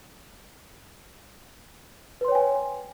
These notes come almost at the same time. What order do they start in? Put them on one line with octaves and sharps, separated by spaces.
B4 C6 C#5 G5 G#5